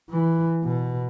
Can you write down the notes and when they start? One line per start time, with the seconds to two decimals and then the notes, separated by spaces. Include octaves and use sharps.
0.10 E3
0.64 B2